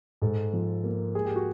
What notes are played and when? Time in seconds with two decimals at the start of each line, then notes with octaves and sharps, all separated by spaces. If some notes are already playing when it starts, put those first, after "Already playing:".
0.22 G#2 A4
0.53 F3
0.84 A#3
1.15 G#3 G#4
1.25 G4
1.36 F#4